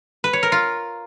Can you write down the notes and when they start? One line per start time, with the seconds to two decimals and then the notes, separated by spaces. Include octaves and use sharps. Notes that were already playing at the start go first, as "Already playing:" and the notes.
0.24 B4
0.33 C#5
0.43 A#4
0.52 F4